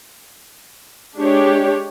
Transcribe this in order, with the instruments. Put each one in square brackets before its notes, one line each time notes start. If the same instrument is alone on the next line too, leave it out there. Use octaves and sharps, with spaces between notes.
[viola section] G#3 D4 G4 C#5